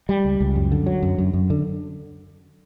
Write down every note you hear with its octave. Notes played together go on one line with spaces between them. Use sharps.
G3
C#2
C#2
F#2
D3
F#3
F#2
F#2
F#2
D3